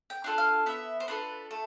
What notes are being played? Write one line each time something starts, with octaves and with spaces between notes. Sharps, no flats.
G5
D4 F4 A4
F5
B3 E5
C5
D4 F4 A4 B4
A3 A4